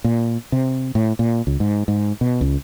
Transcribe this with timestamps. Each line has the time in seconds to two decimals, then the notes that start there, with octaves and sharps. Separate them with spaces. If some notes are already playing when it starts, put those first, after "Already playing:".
0.04 A#2
0.52 C3
0.95 A2
1.19 A#2
1.47 C#2
1.60 G#2
1.88 G#2
2.21 B2
2.41 C#2